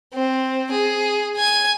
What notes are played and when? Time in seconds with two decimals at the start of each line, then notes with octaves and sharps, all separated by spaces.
0.14 C4
0.71 G#4
1.36 G#5 G#6